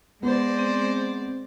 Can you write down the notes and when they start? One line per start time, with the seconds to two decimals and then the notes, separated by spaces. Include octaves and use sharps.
0.23 G#3 B3 C5 D5
0.59 C4